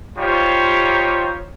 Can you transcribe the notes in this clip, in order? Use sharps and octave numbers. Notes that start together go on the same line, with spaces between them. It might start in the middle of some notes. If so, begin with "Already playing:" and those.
G3 D#4 F4 G4 C5 C#5